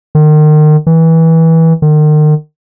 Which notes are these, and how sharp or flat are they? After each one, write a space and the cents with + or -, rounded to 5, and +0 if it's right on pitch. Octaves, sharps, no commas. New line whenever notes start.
D#3 -35
E3 -20
D#3 -40